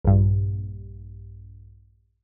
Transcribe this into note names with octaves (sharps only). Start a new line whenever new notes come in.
A#1 G2